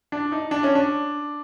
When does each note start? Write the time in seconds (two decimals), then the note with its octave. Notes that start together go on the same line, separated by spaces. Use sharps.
0.12 D4
0.32 D#4
0.51 D4
0.63 C#4
0.75 D4